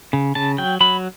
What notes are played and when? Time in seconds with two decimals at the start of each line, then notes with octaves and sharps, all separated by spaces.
0.13 C#3
0.35 C#3 A5
0.58 F#3 G5
0.81 F#3 B5